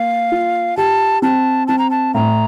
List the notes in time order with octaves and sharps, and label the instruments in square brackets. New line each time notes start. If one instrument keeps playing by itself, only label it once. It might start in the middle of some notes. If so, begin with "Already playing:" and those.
Already playing: [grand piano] A#3 [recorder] F5
[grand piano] F4
[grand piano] G4 [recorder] A5
[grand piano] C4 [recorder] A5
[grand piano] C4 [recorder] A5
[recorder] A#5
A5
[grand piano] A2 [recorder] A#5